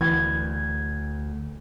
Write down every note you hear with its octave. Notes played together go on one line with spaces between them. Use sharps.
D2 E3 G#6